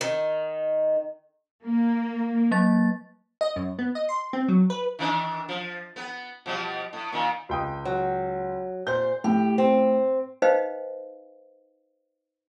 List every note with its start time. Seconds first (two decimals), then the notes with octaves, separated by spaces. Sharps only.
0.01 D#3
1.65 A#3
2.51 F#3 A#3 A6
3.41 D#5
3.56 F#2
3.79 B3
3.95 D#5
4.09 C6
4.33 C4
4.48 F#3
4.70 B4
4.99 D#3 E3 D4
5.49 F3
5.96 B3 B4
6.46 B2 F3 G3
6.93 A2
7.12 A#2 D#3
7.49 C#2 G5 D#6
7.85 F#3
8.87 A#2 C5 G6
9.24 A2 G4
9.58 C4
10.42 D#4 B4 C5 D#5 F5 G5